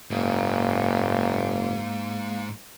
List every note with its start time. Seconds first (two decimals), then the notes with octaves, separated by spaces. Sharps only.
0.11 F#1 G#2 A#3